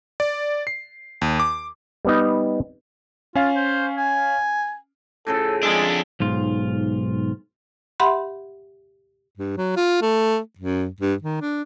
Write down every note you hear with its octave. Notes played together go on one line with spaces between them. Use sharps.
D5
C7
D#2
D6
G3 B3 D#4
C#4 F4 F5
C5
G#5
A2 C#3 F3 A4
F2 G#3 D4 G#4 A4 E5
B1 G#2 F4
G4 E5 F#5 B5 C6
G2
F#3
F4
A3
F#2
G2
D#3
D4